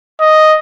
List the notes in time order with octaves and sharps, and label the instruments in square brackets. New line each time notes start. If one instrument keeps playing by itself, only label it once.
[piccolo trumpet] D#5